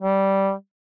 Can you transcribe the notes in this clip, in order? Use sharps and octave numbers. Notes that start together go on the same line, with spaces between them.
G3